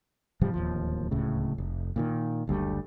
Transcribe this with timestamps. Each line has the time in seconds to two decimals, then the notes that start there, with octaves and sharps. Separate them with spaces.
0.41 G#2 C3 F3 G3
0.54 D1 D#2 F3
1.11 D1 C#2 A2 C#3
1.58 F1
1.96 A#2 D3 D#3
2.47 F#1 D2 G3 A3